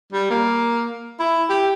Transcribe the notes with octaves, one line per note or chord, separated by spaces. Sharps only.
G3
A#3
E4
G4